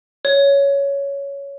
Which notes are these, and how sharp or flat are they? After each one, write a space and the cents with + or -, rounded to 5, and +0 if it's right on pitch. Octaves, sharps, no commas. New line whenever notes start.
C#5 +10